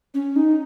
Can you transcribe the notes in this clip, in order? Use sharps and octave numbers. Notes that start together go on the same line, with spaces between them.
C#4
D#4